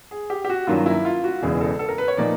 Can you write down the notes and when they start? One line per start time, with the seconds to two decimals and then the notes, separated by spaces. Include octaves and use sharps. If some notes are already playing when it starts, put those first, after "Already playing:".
0.11 G#4
0.30 G4
0.45 G4
0.50 F#4
0.67 G2 D#3 F#3 A#3 C#4 F4
0.86 E4
1.05 F4
1.24 F#4
1.42 E1 E2 C#3 E3 G#4
1.61 A4
1.79 A4
1.89 A#4
1.98 B4
2.08 C#5
2.17 A#2 F3 A#3 D#4 D5